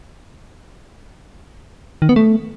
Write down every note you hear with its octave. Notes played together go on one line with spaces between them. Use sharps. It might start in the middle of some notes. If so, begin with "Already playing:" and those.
D#3
B3
A3